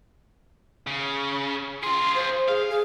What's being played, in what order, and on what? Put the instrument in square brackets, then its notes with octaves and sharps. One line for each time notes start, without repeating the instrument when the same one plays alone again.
[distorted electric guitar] C#3
[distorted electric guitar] F4 G#4 [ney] C6
[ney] C5
[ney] G#4 [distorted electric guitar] F5
[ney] G#4